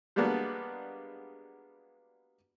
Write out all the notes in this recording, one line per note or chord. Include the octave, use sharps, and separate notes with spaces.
G3 G#3 A#3 B3 D4 F#4